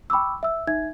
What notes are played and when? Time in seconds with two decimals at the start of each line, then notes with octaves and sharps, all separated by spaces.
0.10 G5 B5 C#6 D6 E6
0.43 E5 E6
0.67 D#4 E5 G#6